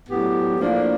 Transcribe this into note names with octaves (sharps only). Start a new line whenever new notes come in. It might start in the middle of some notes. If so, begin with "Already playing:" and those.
A2 F#3 B3 D4 G4
A2 F3 A#3 D4